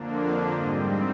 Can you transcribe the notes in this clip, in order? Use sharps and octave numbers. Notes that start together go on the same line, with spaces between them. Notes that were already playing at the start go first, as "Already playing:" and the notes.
Already playing: F2 D3 F3 A#3 D4
F5
G#2 G3 C4 D#5